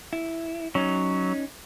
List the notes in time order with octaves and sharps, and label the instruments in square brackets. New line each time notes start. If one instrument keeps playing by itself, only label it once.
[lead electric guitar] E4
[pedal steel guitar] F#3 [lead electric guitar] C#4 D#4